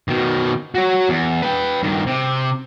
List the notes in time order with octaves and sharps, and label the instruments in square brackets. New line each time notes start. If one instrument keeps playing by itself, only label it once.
[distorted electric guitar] B2 D#3
F#4 C#5
E2
B4 G5
G2 D#3
C3